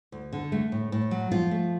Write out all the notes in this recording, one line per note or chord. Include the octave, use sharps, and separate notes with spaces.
D2
D3
A3
A2
A2
F#3
F3 F4
A3